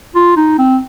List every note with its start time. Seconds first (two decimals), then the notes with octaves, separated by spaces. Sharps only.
0.15 F4
0.36 D#4
0.59 C4